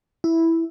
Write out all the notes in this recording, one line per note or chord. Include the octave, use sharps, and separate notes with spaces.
E4